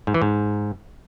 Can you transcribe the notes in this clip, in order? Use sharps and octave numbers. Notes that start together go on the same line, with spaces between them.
G#2
E3
G#2